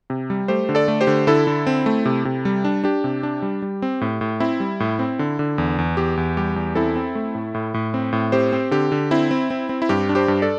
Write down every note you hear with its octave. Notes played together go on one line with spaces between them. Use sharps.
C3
G3
A3 G4 C5
D3
A4 D5
A3
G4 C5
D3
D3 E4 A4
D3
C4
A3
C3
C3
G3
D4
D4 G4
C3
D4
G3
G3
C4
A2
A2
C4 E4
G3
A2
C4
D3
D3
E2
E2
E2 G4
E2
G3 G4
E2
C4 E4 A4
C4
A3
A2
A2
A2
C4
A2
C4 G4 C5
C4
D3 G4
D3
C4 E4
C4
C4
C4
E4
G2 G4
D4
G4 C5
G2
A4 D5